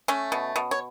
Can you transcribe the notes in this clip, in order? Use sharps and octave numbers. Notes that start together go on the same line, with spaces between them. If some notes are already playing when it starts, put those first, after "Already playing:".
A3 C#4
B2
B2
C#5